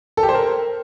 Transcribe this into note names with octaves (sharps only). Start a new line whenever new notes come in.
A4
G4
C5
A#4